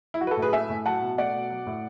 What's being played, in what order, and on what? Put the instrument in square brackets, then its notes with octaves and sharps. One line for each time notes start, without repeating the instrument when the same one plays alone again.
[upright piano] E4
F#3 F#4
B4
F#4 A4
A2
G#4 B4
A3 E5 G#5
A2
F#3 F#5 A5
B2
A3 D5 F#5
B2
F#3
A2